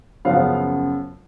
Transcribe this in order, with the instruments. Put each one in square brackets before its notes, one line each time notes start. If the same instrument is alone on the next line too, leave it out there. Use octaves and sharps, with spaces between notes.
[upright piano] F#2 C#3 F3 B3 F5